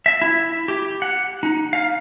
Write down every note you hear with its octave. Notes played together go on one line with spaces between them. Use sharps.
E5
E4
G4
F#5
D#4
F5